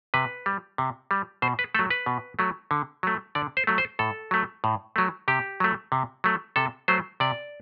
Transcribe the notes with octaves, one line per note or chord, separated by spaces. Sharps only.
C3 B4
G3
C3
G3
B2 C5
B4
F#3 A3 A4
B4
B2
F#3 A3
D3
F#3 A3
D3 D5
C5
F#3 A3
C5
A2 A4
F#3 A3
A2
F#3 A3
C3 G4
F#3 A3
C3
F#3 A3
C3 A4
F#3 A3 C5
C3 D5